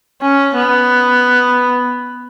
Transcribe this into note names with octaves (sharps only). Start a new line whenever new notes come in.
C#4
B3